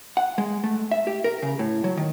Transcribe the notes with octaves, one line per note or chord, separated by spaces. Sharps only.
F#5
G#3
A3
E5
G4
A#4
C#3
A2
F#3
D#3